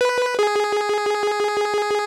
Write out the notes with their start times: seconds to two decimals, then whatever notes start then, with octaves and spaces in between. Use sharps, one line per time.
0.01 B4
0.39 G#4